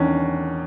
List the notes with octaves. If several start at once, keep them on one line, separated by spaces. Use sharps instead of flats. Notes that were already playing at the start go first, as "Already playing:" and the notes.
Already playing: E2 D#3 C#4 D4